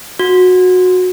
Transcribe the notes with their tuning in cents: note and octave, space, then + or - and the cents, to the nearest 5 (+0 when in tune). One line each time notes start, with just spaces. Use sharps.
F#4 -15